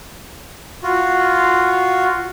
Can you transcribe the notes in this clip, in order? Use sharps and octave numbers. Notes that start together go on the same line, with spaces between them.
F4 F#4